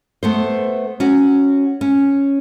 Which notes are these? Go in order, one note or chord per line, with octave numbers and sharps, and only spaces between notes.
A3 B3 C5
C#4 F#4
C#4